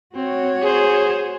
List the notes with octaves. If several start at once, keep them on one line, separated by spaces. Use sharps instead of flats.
C4 F#4 C#5
G#4 C5